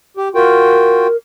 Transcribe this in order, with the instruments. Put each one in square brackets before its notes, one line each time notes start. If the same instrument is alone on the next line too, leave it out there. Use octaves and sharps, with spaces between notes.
[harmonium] G4
[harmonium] F4 F#4 G5 [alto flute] A#4